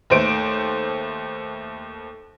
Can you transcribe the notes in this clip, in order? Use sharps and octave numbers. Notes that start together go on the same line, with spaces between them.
D#2 A3 C5 D7